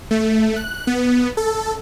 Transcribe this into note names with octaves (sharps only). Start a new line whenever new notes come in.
A3
F#6
B3
A4